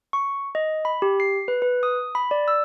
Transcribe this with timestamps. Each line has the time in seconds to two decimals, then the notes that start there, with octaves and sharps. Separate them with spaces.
0.13 C#6
0.55 D#5
0.85 B5
1.02 G4
1.20 C7
1.48 B4
1.62 B4
1.83 D#6
2.15 B5
2.31 D5
2.48 E6